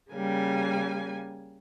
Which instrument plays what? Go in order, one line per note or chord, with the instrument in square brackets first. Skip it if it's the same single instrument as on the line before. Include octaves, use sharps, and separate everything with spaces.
[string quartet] C#3 G3 A#3 G#5